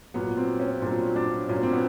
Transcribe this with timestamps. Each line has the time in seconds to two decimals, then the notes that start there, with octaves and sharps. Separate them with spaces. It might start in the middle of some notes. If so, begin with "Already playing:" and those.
0.14 A#2 F#3 B3
0.37 C4
0.60 C#4
0.82 A#2 F#3 D4
1.16 D4
1.49 A#2 F#3 C#4
1.63 C4
1.73 B3